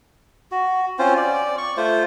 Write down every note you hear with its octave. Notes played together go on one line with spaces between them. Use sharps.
F#4
C4 C#4 F4 C5
D5
C#6
A3 F4 C5